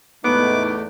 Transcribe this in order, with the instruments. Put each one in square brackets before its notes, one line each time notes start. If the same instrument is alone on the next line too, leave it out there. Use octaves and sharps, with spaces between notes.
[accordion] E2 A3 [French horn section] A2 D#4 [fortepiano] B3 [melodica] D6